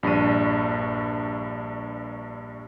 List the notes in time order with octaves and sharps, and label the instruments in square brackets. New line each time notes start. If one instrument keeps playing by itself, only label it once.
[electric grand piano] A#1 G2 D4 D#7